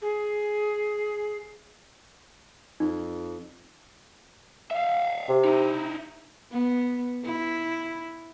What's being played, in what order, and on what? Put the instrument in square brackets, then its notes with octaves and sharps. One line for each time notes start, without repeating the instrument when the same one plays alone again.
[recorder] G#4
[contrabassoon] F2 [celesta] D#4
[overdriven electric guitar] E5 F5
[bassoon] C3
[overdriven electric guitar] D#4 E4
[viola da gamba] B3
E4